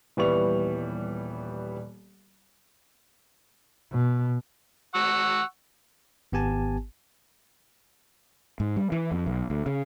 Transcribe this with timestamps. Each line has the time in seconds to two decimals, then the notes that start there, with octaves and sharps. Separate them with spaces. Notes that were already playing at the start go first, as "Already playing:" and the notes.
0.17 D#1 E3 G3 B3 C#6 F7
3.92 B2
4.95 F#5 C#6 E6
6.32 G#1 B3 G4 G#5 A5
8.60 G#2
8.77 G3
8.92 E3
9.11 F2
9.26 B1
9.50 D2
9.66 C#3